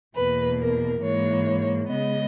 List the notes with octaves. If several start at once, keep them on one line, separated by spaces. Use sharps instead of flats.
E2 B2 A#3 B4
A#4
G#2 E3 A#3 C#5
C#3 G#3 B3 D#5